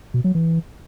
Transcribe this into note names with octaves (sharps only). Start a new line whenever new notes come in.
B2
F#3
E3